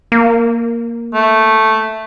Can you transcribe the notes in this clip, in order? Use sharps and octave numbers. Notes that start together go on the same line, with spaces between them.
A#3
A3